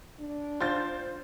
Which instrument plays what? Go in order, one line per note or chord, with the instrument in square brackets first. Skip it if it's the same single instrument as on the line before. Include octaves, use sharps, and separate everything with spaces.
[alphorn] D4
[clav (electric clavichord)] F4 [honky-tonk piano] C5 G6 A6